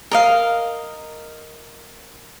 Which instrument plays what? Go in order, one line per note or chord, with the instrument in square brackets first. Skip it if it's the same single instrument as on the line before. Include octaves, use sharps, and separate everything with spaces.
[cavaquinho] A#4 D#5 F5